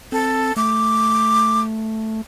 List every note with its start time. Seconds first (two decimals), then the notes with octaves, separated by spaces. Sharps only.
0.12 C4 A4
0.57 A3 D6